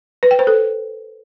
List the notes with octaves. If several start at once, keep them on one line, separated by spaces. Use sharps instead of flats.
B4
G5
C5
A4